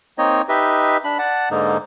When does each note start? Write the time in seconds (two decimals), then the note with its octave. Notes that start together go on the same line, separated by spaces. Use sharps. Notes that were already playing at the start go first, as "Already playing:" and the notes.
0.18 A#3 C4 D#4 C#5 D#5
0.49 D#4 G4 B4 D#5 E5
1.04 D4 B5
1.19 D5 F#5 A5
1.51 G#2 D3 A#3 D#4